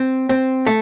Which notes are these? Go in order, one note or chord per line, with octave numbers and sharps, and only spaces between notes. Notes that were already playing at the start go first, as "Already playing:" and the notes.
Already playing: C4
C4
A3